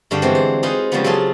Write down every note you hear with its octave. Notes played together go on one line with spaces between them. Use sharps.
G2 D3 D4 F#4 F5 G5
D3 E3 G#3 B3 C4
C5
D#4 F4 G#4 B4 C5 D#5
C#3 F3 G3 G#3 A#3 B3
F#3 A#3 F4 G#4 A4 D#5